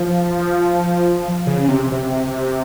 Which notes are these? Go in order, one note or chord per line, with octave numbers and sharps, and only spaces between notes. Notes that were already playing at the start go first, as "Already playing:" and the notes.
Already playing: F3
C#3
C3
C3